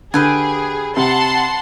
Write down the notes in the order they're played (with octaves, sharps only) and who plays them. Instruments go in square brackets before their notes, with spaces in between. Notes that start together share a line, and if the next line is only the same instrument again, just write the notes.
[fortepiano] D3 [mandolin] G4 B4 G#5 [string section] G#4
[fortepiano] C3 [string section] F#5 A5 C6